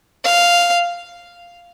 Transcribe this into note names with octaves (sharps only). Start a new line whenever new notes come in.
F5